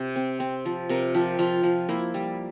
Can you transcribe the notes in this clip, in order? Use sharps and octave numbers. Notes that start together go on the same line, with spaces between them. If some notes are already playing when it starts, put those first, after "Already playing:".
Already playing: C3 C5
C4
C4
F3
C3 A#4
F3 G4
F3 F4
F3
A#3 E4
G3